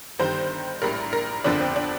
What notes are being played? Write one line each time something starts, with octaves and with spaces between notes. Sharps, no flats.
G1 G2 D#3 G3 C5
A#1 A2 G3 A#4
A#4
G1 F2 D3 F3 D4
C4
D4